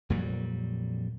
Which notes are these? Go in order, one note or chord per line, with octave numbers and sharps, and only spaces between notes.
F2 A#2 F#3 G3